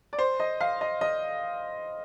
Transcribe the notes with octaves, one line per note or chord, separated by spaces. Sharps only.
D5
C5
D#5
F5
D#5
D#5